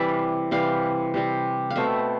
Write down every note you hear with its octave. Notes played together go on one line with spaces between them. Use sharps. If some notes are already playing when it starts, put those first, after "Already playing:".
Already playing: C3 E3 G3 D5 E5
C3 E3 G3 F5
C3 G3 C4
F5
B2 A3 C4 E5